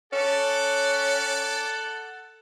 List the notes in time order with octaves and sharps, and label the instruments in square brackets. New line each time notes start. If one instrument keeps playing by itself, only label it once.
[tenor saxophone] C#4 [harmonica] A4 F#5 [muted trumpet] D5